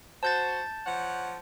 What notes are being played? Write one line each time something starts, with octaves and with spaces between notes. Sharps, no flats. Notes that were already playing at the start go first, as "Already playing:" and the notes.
F#4 C5 A5 G6 A6
F3 C#5 F#5